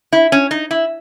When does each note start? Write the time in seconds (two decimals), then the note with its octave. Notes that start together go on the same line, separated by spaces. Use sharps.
0.13 E4
0.32 C#4
0.51 D#4
0.71 E4